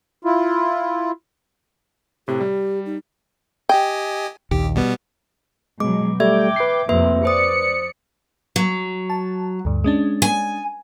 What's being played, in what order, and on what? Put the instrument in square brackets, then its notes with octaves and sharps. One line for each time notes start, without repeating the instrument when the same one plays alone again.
[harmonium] E4 F4
[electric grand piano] A2 C3 [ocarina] G4
[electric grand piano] G3
[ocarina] D#4
[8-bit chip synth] G4 D#5 G#5 [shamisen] G5
[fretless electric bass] A#1 D#2 [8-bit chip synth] G4
[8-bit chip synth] B2 G3 B3
[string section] B2 F#3 [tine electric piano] G#3 [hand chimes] D6
[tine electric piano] G3 A3 [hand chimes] E5 G#6 [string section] G5 D6
[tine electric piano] B4 C7
[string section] F2 A2 C3 [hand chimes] A#3 E5 [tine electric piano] B4
[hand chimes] C5 D#6 [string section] D5 C#7
[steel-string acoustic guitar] F#3
[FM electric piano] A5
D2 G2
G#3 C#4 D4
[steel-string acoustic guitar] G#5